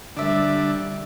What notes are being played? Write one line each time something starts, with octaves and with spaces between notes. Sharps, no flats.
D3 G3 D4 D5 E5